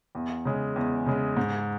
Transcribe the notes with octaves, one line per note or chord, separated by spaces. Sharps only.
E2
C#3 G#3
E2
C#3 G#3
G#2